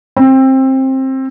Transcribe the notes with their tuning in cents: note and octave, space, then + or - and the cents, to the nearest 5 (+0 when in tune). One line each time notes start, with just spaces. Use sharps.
C4 +20